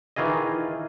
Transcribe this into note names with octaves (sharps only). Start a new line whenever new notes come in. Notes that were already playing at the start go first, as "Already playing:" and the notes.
D#3 E3 F4 G#4 D#5